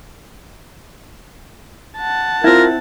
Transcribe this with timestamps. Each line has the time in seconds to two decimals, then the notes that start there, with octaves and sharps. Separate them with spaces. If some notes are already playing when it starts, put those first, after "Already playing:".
1.98 F#5 A5
2.44 C4 E4 F4 A#4